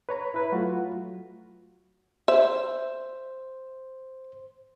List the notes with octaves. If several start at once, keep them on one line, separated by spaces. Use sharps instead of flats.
B4 C#5 A#5 B5
E4 B4
F#3 A3 F4 F#4
C5 E5